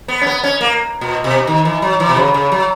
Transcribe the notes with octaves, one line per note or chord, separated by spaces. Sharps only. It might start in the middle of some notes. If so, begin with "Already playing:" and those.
B3
C#4
B3
C#4
A#3
A#2
B2
D#3
E3
F#3
E3
B2
C#3
C#3
F#3